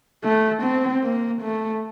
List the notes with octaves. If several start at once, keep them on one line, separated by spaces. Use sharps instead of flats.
A3
C4
A#3
A3